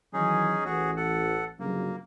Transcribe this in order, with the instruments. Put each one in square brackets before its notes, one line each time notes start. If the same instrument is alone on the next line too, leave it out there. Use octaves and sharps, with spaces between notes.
[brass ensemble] D#3 E3 F#3 [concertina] C#4 D#4 G#4
[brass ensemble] A1 [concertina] F#4 G#4
[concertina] A4 F#5
[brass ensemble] G1 C#3 F#3 [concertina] A#3